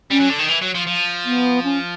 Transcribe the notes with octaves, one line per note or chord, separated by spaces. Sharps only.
G3 C#4
F#3
D3
D#3
E3
F#3
F3
F3
B3
C#4